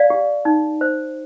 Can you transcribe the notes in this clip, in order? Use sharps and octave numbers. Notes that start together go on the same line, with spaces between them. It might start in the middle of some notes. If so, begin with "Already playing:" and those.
Already playing: D5 F5
G4
D#4
C5